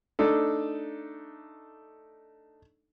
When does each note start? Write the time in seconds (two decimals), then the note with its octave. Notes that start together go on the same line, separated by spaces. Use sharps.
0.19 A3 D4 D#4 A4